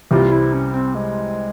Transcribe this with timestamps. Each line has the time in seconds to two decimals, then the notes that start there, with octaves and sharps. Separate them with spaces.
0.11 C2 C3 E3 G3 F4
0.32 E4
0.53 C#4
0.74 C4
0.95 G#3